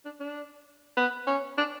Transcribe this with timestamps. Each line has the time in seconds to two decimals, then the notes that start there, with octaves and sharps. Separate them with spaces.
0.05 D4
0.20 D4
0.97 B3
1.27 C#4
1.58 D4